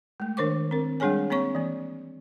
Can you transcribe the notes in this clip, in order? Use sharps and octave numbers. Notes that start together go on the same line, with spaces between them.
G#3 A3
D#3 D4 A#4 C5 C#6 D6
C4 A#4
G3 G#3 D4 G#4 C#5 G#5
A#3 C4 C#5 C#6
E3 A#3